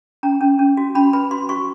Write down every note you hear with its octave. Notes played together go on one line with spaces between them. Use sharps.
C#4 A#5
C#4
C#4
F#4
C#4 B5
B4 B5
F#4 C6
F#4 C#6